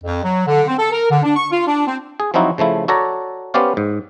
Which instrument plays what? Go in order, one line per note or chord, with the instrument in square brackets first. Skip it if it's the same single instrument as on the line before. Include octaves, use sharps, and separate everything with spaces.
[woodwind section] F2
F#3
D3
C4
A4
A#4
D3
D4
C#6
F4
D4
C4
[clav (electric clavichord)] G#4
F3 F#3 C4 D#4 E4 F#4
C#3 F3 A3 E4
F#4 A4 C#5 D5 A#5
B3 C#4 G4 C5 D5 F5
G#2